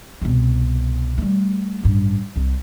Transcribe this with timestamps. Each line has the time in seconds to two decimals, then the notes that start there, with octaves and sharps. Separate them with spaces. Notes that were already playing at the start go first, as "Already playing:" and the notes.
0.21 C2 B2
1.18 G3 A3
1.83 A1 G2
2.36 C2